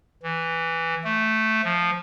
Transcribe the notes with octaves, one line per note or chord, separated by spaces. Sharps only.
E3
A3
F3